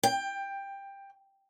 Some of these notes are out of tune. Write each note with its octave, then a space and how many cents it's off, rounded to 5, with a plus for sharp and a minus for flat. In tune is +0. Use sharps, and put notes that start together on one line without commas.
G5 +15